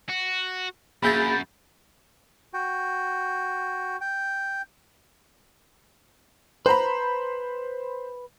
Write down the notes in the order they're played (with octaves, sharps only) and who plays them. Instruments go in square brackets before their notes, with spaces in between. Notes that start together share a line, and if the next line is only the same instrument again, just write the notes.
[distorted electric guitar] F#4
[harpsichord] A#1 G#4 E5 [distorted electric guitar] F#2 [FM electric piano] B5 G6 A6
[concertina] F#4 G5
G5
[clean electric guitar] B4 A#5 [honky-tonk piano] C5 B5